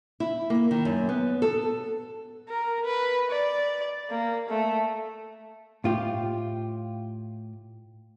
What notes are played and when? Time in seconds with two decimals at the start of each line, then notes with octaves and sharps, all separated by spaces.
0.20 E4
0.50 A#3
0.71 D#3
0.85 F#2
1.09 B3
1.42 A4
2.49 A#4
2.85 B4
3.30 D5
4.11 A#3
4.49 A3
5.84 A2 F4 G4